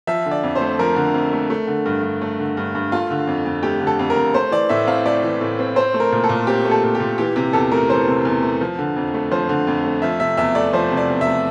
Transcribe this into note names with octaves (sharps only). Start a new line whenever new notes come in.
F3 E5
D3
D5
F2
C5
A3
F3 A#4
D3
F2
A3
A3
D3
G2
G2
A3
D3
G2
G2
A3 F4
D3
F2
F2
A3 G4
D3
A4
F2
A#4
F2
A3 C5
E3 D5
A2 E5
C4 F5
A3 D5
E3
A2
C4
C4 C5
A3
A#4
A#2
A4
A#2
C4 G4
A3
A4
A#2
G4
A#2
E3 G4
C3 G4
E2 A4
A3 A#4
E3 C5
C3
E2
A3
F3
D3
F2
A3
F3 C5
D3
F2
A3
F3 E5
C3 E5
E2 E5
A3 D5
F3 C5
C3
D5
E2
E5
A3